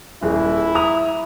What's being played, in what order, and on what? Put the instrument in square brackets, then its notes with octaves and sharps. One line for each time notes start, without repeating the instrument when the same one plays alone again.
[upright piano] D#1 G#4 [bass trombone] E4
[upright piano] A#5 D#6 F7